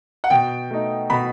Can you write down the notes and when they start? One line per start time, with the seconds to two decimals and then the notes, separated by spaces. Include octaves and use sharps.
0.24 F#5
0.30 B2 G5
0.71 A3 D#4
1.10 B2 B5